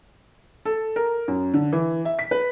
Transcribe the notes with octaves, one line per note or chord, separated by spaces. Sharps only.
A4
A#4
F#2
D3
E3
E5
B6
B4